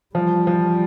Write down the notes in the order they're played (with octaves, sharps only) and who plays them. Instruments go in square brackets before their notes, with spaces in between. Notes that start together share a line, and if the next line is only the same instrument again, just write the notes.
[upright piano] F3 [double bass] G3
[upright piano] F3